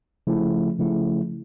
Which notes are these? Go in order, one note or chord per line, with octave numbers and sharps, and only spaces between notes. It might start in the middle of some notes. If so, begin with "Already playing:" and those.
C#3 F3 A3 E4
C#3 F3 A3 E4